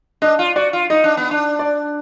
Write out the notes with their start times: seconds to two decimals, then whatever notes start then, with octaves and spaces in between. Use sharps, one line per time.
0.22 D4 D#5
0.39 F4
0.56 F#4 D5
0.73 F4
0.90 D#4 D#5
1.04 D4
1.17 B3
1.31 D4
1.59 D5